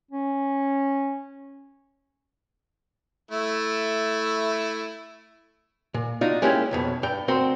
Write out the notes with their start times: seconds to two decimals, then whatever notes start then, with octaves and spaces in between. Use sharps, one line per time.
0.11 C#4
3.31 A3 E4
5.94 A#2
6.21 D4 D#4 F4 F#4
6.42 G#3 A#3 C#4 E4 G4
6.71 B1 F2 B2
7.03 G2 G5
7.28 D2 C4 F#4 A#4 C6